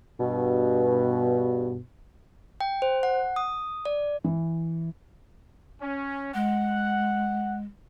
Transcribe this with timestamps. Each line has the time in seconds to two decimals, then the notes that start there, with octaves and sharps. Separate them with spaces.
0.20 G2 B2
2.60 G5
2.82 C5
3.03 F#5
3.36 D#6
3.85 D5
4.24 E3
5.81 C#4
6.34 G#3 F#5